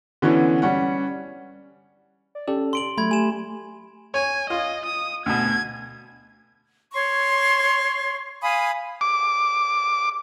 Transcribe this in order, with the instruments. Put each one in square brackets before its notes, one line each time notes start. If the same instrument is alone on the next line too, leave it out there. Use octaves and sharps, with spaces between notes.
[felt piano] D3 E3 B3 C#4
G3 C#4 F#5
[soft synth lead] D5
[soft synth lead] C#4 [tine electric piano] G4 A4 D5
[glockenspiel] C6 D7 F#7
[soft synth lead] F#3 [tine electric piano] A3 [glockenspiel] B5 G#6
[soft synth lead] G4 [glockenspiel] G#5 E7
[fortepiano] C#5 [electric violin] G#5
[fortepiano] F4 [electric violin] D#5
[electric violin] D#6
[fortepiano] D2 B2 [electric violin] G#6
[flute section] C#5 C6 C#6
F5 G#5 B5 D#6
[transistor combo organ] D6